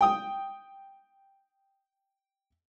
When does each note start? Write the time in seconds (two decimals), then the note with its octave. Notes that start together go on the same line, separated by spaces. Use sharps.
0.01 G5 D#6